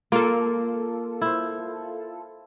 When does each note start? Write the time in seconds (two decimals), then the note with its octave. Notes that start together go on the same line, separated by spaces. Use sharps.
0.12 A#3 F4 A4 A#4
1.21 E4 C5